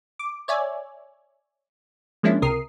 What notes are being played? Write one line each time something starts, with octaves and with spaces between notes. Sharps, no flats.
D6
C#5 D5 E5 G#5
F3 G#3 A#3 C#4 D4 E4
C#2 C3 A#4 D#6 C7